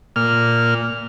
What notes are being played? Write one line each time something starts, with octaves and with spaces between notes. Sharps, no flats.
A#2 F6